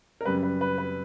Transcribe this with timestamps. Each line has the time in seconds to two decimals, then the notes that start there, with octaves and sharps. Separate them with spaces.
0.21 A#4
0.25 F#2 C#3 G3 B4
0.43 B4
0.61 B4
0.78 B4